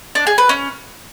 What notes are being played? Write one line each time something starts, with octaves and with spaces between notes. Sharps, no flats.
D4
G#4
B4
C#4